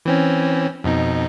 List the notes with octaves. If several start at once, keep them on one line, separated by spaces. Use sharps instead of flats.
E3 C4 C#4
F2 B2 D#4